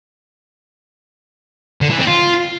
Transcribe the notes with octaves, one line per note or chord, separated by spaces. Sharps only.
D3
E3
C4
F4